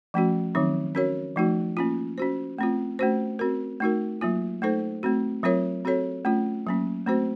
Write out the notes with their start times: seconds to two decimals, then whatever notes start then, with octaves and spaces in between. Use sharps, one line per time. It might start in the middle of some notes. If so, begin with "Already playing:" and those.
0.14 F3 A3 C#4 F#4
0.55 D#3 F#3 C4 D#4
0.95 C#4 F#4 A#4 C#5
1.36 F3 A3 D#4 F#4
1.77 A#3 C#4 F4
2.18 C#4 F#4 C5
2.58 A3 C4 F4
2.99 A3 C#4 F#4 C5
3.39 C4 F#4 A#4
3.80 A3 D#4 F#4 A#4
4.21 F#3 A#3 F4
4.62 A3 D#4 A4 C5
5.03 A3 C4 F#4
5.43 F#3 C4 F4 A#4 C#5
5.85 C4 F#4 A4 C#5
6.25 A3 C#4 F4
6.67 F#3 A#3 C#4
7.07 A3 C4 F#4 C5